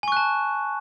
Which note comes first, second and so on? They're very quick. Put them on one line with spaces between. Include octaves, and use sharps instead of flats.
G#5 C#6 F#6 A5